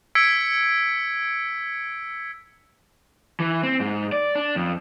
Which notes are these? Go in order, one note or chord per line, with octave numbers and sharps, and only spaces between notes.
E6 G#6 B6 C#7 D7
E3
C4
G#2
D5
D4
F2